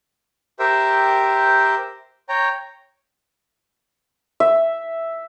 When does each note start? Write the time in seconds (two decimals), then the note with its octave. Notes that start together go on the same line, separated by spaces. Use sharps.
0.59 G4 A#4 C5 E5 G5
2.29 C#5 G5 A#5
4.40 E5